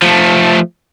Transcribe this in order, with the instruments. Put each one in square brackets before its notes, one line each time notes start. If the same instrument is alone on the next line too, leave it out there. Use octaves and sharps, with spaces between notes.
[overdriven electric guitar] F3 A3